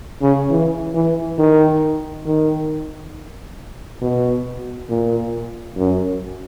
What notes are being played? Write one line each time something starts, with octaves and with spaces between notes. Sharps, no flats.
C#3
E3
E3
D#3
D#3
B2
A#2
F#2